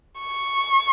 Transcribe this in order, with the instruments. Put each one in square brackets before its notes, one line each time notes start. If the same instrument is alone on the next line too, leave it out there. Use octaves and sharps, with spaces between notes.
[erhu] C#6